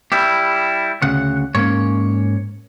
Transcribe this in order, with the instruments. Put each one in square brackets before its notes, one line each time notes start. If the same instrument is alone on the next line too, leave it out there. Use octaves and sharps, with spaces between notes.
[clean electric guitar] G3 E4 G4
[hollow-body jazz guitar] D2 C#3 [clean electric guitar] F#5
[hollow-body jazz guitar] G#2 A#3 C#4 [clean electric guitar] C#5